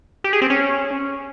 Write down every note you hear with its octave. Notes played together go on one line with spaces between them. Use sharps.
G4
G#4
C4
C#4